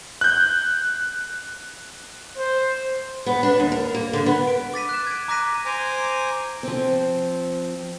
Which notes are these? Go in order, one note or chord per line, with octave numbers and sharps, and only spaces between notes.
F#6 G6
C5
B3
D4
D#2
A#4
A#3
D3
B3
D7
D6 A6 B6 D#7
F#6 E7
G#6 D7
A#5 D6 F#6 A#6 B6 D#7
C5 G#5 A#5 D6
F3 C4